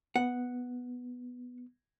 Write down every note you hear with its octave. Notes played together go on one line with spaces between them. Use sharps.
B3 F#5